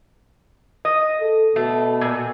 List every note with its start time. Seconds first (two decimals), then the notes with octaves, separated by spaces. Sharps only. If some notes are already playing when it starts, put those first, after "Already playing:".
0.85 D#5
1.21 A4
1.56 B2 A3
2.01 A#2